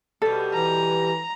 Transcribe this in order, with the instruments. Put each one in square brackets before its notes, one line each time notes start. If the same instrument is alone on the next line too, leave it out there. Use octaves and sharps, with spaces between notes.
[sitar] B2 G3 [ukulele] A4
[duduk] E3 [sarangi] A#5